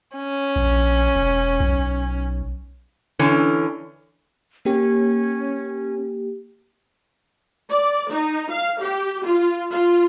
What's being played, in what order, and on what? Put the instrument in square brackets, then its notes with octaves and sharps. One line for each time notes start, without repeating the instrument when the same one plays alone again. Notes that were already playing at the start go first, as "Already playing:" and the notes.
[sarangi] C#4
[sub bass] A#1
E1
B1
[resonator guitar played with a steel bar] D3 E3 C#4
[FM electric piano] A#3 G4 [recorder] C#4
[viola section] D5
D#4
F5
G4
F4
F4